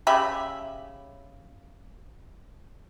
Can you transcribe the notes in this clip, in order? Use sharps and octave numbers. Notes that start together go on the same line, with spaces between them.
C#3 G4 E5 B5